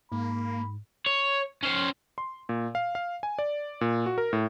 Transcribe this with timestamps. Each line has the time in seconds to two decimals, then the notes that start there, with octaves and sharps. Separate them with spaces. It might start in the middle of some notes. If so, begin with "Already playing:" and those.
0.12 G#2 A#3 B5
1.06 C#5
1.63 C#4 C5
2.18 C6
2.49 A#2
2.75 F5
2.95 F5
3.23 G#5
3.39 D5
3.81 A#2
4.06 F#4
4.18 A#4
4.33 A2